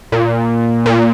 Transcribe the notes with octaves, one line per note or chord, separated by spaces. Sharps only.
A#2
A#2